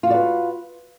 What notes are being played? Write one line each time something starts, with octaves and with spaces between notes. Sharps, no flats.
F4 F#4 B4 D5